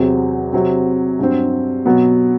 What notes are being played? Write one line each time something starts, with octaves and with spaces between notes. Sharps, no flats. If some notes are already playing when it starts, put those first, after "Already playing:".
Already playing: E2 C3 F#3 C4
C3 F#3 C4
G2 F#3 C4
B2 F#3 B3